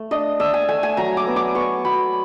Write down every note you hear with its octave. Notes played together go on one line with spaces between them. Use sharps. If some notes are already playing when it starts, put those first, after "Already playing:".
Already playing: A3
D4 D#5
D4 E5
G#5
A3 G#5
G#5
F#3 A#5
D6
B3
D6
B3 C#6
F#3 B5